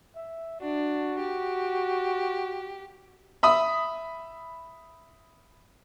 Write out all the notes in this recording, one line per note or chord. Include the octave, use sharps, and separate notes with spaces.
E5
D4 F#4
G4
E5 B5 D#6